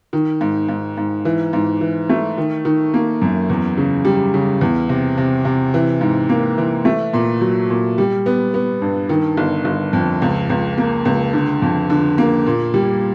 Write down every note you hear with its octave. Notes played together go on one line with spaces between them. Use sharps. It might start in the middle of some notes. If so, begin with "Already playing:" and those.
D#3
G#2
G#2
G#2
E3
G#2
E3
A3
D#3
D#3
A#3
F#2
E2
C#3
G3
C#3
E2
C3
C3
C3
E3
G#2
A#3
E3
A3
A#2
F#3
A#2
G3
B3
B3
G2
D#3
G1
G1
F2
C#2
C#2
A#3
C#2
D3
F2
D3
A#3
A#2
G3